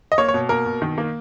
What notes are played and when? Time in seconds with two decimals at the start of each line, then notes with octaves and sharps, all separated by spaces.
0.12 D#5
0.18 A#3 C#5
0.29 C#5
0.34 B2
0.49 A#3 A#4
0.66 B2
0.82 D#3
0.98 A#3